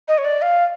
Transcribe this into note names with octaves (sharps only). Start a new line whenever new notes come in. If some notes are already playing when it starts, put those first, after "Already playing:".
D#5
C#5
D5
F5